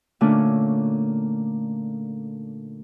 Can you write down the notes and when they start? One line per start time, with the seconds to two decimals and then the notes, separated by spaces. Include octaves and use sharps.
0.21 A#2 D3 A3 C#4 D4